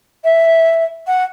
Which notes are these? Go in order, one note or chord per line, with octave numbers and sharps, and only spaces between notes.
E5
F#5